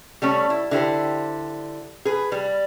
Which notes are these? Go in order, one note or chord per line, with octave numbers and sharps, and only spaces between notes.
G3 A3 C#4
E4
D3 E4 G4 C5
G#4 B4
G3